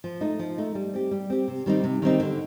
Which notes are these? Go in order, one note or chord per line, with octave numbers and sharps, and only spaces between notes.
F3
A3 D#4
F3
A3 D#4
G3
C4 G4
G3
C4 G4
C3
D#3 G3 C4 D#4
C3
D#3 G3 C4 D#4
D3